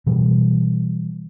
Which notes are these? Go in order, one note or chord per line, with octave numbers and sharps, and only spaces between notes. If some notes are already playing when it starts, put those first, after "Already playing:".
B2 E3 G3